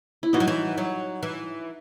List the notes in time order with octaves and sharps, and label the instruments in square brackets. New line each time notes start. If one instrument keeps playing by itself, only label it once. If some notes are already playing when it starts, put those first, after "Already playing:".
[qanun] E4
[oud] E3 [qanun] D#4 F#4
[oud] F#3
E3
F#3
E3